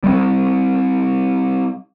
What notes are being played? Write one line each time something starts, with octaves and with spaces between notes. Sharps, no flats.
G3 G#3 C4